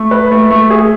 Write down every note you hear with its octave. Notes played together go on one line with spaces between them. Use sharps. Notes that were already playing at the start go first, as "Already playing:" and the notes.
Already playing: A3
B4
A3
A3
G#4